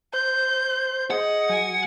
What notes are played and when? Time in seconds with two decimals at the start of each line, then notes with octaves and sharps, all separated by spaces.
0.14 C5 G6
1.11 G#4 D#5 F#5
1.49 F#3 G#5